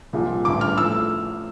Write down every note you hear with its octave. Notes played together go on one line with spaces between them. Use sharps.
C2 A#2 F3
A1 G2 D3 D6
F6
A2 F3 E6